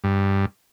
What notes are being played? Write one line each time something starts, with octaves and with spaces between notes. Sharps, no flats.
G2